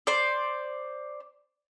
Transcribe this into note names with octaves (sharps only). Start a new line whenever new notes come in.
C5 D5